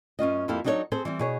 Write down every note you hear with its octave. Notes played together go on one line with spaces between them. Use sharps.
F#2 C#4 F4 D#5
F2 A#3 E4 G4 A4 F5
F#3 D4 D#4 A4 A#4 C#5
C4 G#4 A4 C5
E3 G3 C4
B2 G#4 C#5